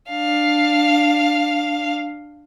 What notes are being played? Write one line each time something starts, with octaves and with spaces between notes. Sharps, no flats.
D4 F5